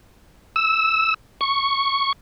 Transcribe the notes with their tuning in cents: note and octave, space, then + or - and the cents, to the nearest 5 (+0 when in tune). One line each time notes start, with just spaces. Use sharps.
E6 -10
C#6 -5